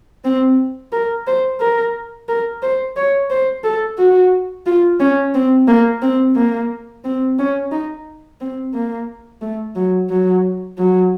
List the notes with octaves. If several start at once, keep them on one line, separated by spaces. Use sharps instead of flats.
C4
A#4
C5
A#4
A#4
C5
C#5
C5
A4
F#4
F4
C#4
C4
A#3
C4
A#3
C4
C#4
D#4
C4
A#3
A3
F#3
F#3
F#3